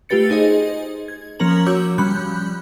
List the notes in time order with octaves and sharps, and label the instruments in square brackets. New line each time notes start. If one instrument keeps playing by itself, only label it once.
[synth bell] A3 F4 G4 B4 A6 C#7
D#4 G#4 C5 D#5
G#6
F3 A#3 C#4 A#4 A#5 F#7
F#4 C#5 D6 E6 G6
F3 G3 C#4 B5 F#6 G6